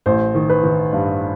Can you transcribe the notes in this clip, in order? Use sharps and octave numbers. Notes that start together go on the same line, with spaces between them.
A1 C5
D#3
B4
D#3
G2